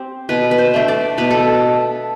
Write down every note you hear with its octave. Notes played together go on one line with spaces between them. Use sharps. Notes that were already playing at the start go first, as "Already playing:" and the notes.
Already playing: C4 G4
B2 B4
B4
C5
A3 D4
D5
B2 B4
A4